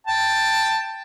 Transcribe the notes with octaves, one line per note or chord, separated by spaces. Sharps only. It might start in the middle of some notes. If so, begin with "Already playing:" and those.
G5 A5